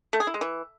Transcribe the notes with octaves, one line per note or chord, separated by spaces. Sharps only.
A3
G#4
E4
G#3
E3